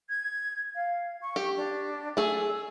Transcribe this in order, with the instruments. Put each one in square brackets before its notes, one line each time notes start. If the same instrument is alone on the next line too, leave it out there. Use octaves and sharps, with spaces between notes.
[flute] G#6
F5
C#6
[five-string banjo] G4
[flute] D4
[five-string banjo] A3 G#4 [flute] E6